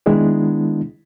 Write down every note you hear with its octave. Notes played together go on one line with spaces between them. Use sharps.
D#3 G#3 B3 D4 E4